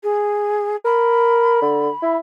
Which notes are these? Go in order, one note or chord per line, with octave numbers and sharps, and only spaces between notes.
G#4
A#4 B5
D3
E4